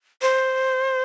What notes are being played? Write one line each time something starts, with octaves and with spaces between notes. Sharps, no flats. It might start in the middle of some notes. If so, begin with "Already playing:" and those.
C5